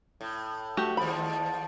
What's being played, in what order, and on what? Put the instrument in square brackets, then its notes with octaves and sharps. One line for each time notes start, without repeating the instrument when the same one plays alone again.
[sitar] A2
[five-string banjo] A3 F#4 G4
[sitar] D#2 F3 [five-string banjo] B5